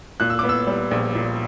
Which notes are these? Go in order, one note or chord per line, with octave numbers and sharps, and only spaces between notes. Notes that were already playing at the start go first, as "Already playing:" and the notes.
A#2 F#6
E6
B3 D6
E6
G3
A#1
A#2